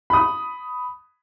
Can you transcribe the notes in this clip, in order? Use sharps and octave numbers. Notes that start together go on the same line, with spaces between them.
B5 D#6